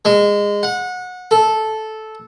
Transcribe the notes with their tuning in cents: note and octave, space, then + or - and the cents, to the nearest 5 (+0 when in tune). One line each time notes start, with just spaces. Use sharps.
G#3 -20
F#5 -25
A4 -10